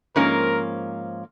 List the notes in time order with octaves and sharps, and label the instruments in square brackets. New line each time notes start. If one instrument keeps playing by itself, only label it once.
[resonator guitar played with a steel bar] G#2 F3 A#3 C#4 [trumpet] A#4